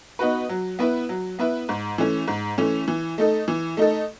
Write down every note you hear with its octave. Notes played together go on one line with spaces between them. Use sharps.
B3 D#4 F#4 B4
F#3
B3 E4 B4 E5
F#3
B3 E4 B4 E5
G#2
E3 A3 C#4
G#2
E3 A3 C#4
E3
A3 D#4 A4
E3
A3 D#4 A4